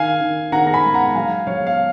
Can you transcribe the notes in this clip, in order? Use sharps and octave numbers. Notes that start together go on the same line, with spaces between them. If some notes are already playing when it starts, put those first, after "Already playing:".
Already playing: D#3 F5 G#5
D#3
D#3 F#5 A#5
A#5
G#5 B5
G#3
F#5 A#5
F#3 F5 G#5
F#3 C#5 F5
F5